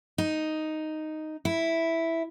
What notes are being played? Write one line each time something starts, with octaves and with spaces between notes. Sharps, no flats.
D#4
E4